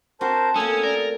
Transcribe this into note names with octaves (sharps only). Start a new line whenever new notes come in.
C4 F#4 A#4 C5 A5
A3 A#3 C#4 G#5 D#6 E6
A#4 D5